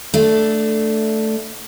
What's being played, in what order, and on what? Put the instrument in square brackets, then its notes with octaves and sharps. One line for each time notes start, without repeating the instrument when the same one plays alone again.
[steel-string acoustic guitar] A3 D4